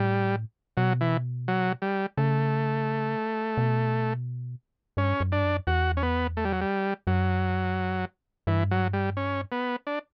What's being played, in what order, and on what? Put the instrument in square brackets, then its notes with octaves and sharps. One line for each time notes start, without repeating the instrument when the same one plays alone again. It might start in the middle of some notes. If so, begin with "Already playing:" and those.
Already playing: [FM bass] A2 [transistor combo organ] G3
[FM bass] B2 [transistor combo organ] F#3
[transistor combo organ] E3
F#3
G3
[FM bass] C#3 [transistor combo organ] A3
[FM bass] B2
[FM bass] G2 [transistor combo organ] C#4
[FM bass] F#2
[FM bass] G2 [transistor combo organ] D4
[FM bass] F#2
[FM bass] E2 [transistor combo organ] F#4
[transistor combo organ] C#4
B3
A3
G3
F#3
G3
[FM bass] F#2 [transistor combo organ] F#3
[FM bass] G2 [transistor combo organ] E3
[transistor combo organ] F#3
G3
C#4
B3
D4